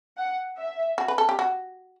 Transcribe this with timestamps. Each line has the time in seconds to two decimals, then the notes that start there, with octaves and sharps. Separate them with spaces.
0.18 F#5
0.58 E5
0.98 F#4
1.08 B4
1.18 A4
1.29 G4
1.39 F#4